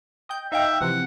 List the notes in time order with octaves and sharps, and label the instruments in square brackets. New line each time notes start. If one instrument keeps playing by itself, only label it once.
[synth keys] D#5 G5 G6
[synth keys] D#4 F5 G5 [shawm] E5
[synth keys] C3 E3 F3 [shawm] F#5